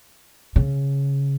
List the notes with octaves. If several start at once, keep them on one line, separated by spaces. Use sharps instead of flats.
C#3